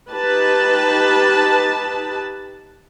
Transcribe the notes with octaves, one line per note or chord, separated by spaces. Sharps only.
D#4 G4 B4 A5